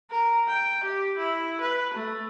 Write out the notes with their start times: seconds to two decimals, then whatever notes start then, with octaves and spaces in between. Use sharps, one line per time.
0.11 A#4
0.48 G5
0.84 G4
1.18 E4
1.61 B4
1.94 A3